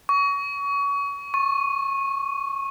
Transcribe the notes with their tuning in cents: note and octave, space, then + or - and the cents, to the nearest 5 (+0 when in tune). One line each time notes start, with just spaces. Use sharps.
C#6 +30
C#6 -20